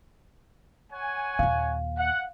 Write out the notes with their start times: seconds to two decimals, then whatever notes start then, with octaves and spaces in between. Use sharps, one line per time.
0.93 C#5 F#5 G#5
1.39 D#2 A#2 F5
1.97 F#5